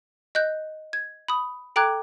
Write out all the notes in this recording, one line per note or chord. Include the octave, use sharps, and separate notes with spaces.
D#5 F#6 G6
G#6
B5 D#6
A4 G5 A#5 D6 F#6 G#6